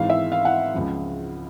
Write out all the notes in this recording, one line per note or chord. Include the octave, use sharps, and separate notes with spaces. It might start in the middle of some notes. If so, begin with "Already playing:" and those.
Already playing: G#1 G#2 E3 F5
E5
F5
F#5
C#2 C#3 F3